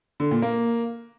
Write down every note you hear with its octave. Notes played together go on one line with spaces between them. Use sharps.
D3
A#2
A#3